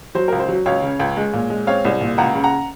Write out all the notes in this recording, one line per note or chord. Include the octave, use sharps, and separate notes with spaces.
F#3 C5
C#2 A#4
C5
F#3
C#2 C#5 F5
C#3
C#2
G#3
A#2
G#3
C4 C#5 F5
C2
A#2
C#2 F#5 A#5
C#3
F#5 A#5